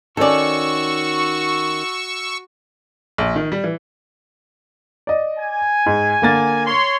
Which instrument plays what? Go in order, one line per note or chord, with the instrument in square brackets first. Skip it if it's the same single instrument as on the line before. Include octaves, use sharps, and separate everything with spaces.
[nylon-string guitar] D#3 C#4 [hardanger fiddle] F#4 [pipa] A4 D5 [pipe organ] C#6 E6
[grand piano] A#1
D#3
G3
E3
[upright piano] D5 D#5
[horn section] G#5
[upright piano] G#2
D3 A#3 A6
[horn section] C#5 C6